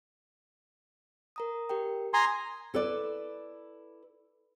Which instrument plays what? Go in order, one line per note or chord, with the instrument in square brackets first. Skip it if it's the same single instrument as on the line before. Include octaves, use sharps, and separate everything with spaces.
[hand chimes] A#4 A#5 D#6
G4 A#4 G5
[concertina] G#5 A#5 C6 [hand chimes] D#6
[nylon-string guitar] E4 A4 B4 D5